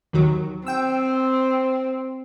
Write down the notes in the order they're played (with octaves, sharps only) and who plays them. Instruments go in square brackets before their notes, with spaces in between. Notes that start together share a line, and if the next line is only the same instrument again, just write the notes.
[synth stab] D#2 D#3 F#3
[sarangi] C4 [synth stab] G5 E6